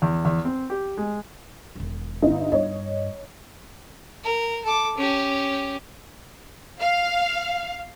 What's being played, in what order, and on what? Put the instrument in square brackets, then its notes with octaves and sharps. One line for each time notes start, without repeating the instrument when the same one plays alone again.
[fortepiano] E2
E2
C4
G4
G#3
[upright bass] E1 D#3
[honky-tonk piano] G1 D#4 E4
[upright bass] G2 [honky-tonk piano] C#5 D#5
[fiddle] A#4
A4 D6
C#4 G4
[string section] F5